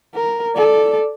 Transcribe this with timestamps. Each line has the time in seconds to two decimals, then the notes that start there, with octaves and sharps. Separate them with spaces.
0.15 A#4
0.56 A4 D5